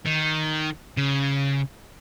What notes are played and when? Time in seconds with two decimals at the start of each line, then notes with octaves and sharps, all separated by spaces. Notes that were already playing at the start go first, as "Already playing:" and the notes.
0.06 D#3
0.97 C#3